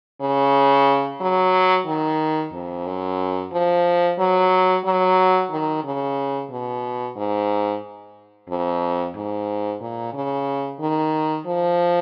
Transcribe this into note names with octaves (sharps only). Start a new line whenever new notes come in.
C#3
F#3
D#3
F2
F#2
F3
F#3
F#3
D#3
C#3
B2
G#2
F2
G#2
A#2
C#3
D#3
F3